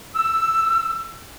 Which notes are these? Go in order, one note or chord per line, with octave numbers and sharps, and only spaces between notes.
E6